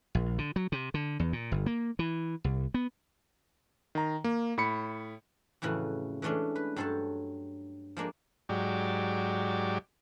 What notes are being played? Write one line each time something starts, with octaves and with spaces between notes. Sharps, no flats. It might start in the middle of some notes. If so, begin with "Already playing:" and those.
A#1
D3
F#3
C3
D3
E2
A#2
G1
A#3
E3
C2
B3
D#3 A#5
A#3
A2 B5 C#7
F2 A2 C#3 E3 F#4
E3 G#3 A3 C#4 D4
B4
G2 F#3 A4 C5 C#5 A5
F3 G#3 A#3 D4
G#2 F#3 G4 D5